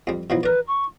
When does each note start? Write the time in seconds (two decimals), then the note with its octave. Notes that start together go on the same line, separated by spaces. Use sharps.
0.07 F2 G3
0.30 B2 F3 F#3 E4
0.43 A#4 B4 D5
0.68 C#6